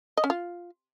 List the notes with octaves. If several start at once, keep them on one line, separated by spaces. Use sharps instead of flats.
D#5
C#4
F4